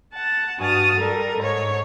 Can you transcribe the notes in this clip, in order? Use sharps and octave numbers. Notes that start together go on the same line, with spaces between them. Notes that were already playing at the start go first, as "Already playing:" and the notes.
F#5 A5
G2 F#4 A5 D#6 F6
G3 A4 A#4
G#2 C#5